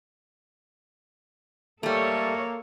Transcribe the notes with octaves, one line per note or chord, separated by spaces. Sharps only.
G3 A3 A#3 A4 C#5